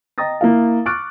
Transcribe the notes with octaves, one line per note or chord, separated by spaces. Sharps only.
D#5 G5 A#5 D#6 A6 A#6
A#3 E4 F5
C#6 D6 F6 F#6 A6 D7